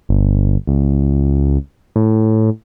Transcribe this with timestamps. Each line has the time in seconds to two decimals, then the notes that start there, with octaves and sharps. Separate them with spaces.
0.09 G1
0.67 C#2
1.96 A2